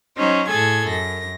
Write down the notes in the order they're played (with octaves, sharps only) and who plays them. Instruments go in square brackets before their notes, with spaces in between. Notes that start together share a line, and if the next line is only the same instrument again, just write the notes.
[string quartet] F#3 C#4 D#4 C5
A2 G#4 A4 G#6
F#2 A#6